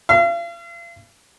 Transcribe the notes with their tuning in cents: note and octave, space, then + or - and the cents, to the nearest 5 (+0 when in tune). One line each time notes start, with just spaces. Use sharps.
F5 -40